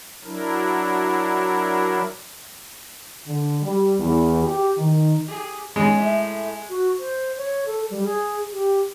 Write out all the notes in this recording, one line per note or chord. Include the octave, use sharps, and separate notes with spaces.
F#3 D4 E4 A#4
D3
G3
E2
G4
D#3
G4 G#4
G#3 C#4
A2 E5
F#4
C5
C#5
A4
G3
G#4
G4